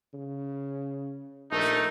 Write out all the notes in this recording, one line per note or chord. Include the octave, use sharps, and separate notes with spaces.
C#3
A#1 A3 D#4 A#4